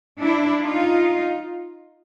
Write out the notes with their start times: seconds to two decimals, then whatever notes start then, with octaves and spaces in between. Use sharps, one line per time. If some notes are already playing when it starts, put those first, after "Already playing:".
0.20 D4 E4
0.62 D#4 F4